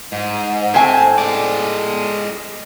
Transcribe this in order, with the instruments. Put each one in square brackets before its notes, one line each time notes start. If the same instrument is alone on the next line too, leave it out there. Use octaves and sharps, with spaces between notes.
[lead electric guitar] G#2
[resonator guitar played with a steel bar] A2 G#5 [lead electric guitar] C4
[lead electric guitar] G#3 D5